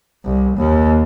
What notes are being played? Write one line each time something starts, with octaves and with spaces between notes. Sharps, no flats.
C2
D#2